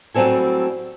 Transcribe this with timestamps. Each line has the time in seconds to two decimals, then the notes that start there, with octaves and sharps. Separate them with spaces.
0.14 A2 F#3 G3 C4 A4 G#5